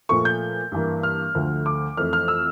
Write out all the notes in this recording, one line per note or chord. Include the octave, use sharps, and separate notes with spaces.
A#2 F3 A3 C#6
G6
G2 E3 A#3
F6
D2 D3 F3 A3
D6
F2 E3 A3 F6
F6
E6